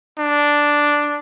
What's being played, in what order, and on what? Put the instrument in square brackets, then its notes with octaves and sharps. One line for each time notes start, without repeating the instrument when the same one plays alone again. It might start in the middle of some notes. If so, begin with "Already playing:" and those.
[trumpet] D4